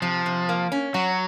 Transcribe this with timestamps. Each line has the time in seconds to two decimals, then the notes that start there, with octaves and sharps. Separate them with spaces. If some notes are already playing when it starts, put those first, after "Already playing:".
0.02 C3 F3
0.26 C3
0.49 A#3
0.72 C#4
0.94 F#3 F#4